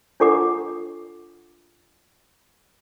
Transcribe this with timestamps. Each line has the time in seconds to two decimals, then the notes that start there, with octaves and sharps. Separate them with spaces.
0.20 D4 F4 A4 F#5 D6